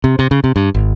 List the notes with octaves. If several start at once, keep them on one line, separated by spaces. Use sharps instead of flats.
C3
C3
C#3
C3
G2
G#1